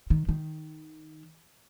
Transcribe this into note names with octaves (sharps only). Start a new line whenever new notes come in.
D#3
D#3